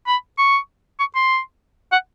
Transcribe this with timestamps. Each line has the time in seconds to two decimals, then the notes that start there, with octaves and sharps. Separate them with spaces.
0.07 B5
0.38 C#6
1.00 C#6
1.15 C6
1.92 F#5